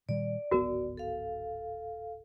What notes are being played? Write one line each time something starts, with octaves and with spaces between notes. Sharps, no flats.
A#2 D#3 G3 D5
D1 G#1 B3 F#4 A#4
A4 F5